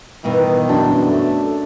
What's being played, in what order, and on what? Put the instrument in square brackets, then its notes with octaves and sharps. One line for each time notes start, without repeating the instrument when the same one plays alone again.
[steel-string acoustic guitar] G2 B2 E3 [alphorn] D#3
[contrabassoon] F#2 [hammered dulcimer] D4
[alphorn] A3